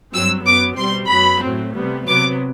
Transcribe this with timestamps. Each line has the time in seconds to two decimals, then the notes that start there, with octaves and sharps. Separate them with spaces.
0.13 G2 F#3 C4 E6
0.46 F#2 F#3 B3 D6
0.78 B2 G3 C4 C6
1.10 F#2 F#3 B3 B5
1.43 A2 F#3 A3 C4
1.75 C3 G3 B3
2.08 C3 F#3 B3 D6